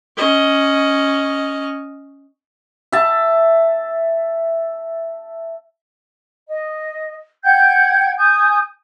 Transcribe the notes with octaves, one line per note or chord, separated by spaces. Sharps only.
C#4 D#5
E5 A5
D#5
F#5 G5 G6 G#6
G#5 D#6 G6